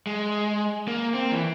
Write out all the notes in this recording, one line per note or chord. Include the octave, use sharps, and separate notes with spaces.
G#3
A#3
C4
E3